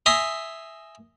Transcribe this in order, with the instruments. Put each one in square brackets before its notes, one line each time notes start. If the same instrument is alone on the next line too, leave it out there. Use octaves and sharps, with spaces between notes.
[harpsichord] E5 G#5 A#5 C6 D#6